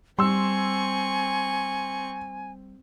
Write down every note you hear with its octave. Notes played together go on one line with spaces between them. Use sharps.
G3 C4 G#5 C6 C#6 E6